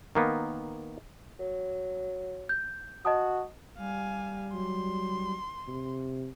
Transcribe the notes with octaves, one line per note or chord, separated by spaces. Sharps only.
D#3 A#3 B3
F#3
G6
F#4 D#5 A5 D#6
G3 F5 G#5
F#3 C6
C3